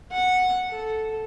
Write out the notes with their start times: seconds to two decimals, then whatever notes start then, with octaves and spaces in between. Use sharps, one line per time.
0.12 F#5
0.71 A4